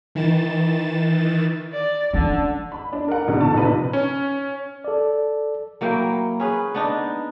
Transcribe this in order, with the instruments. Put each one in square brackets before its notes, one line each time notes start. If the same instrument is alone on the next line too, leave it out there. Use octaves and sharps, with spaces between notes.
[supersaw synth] D#3 E3 A6 E7
[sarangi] D5
[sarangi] D3 [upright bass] C#4
[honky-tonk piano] B5
D4
A#4 F#5
A#1 B2 D3 D#3
A4 A5
A#1 C3 D#4 B4
[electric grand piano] C#4
[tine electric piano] A4 D5
[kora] F#3 A#3 E4 G5
C#4 G#4 B4
B3 D4 D#4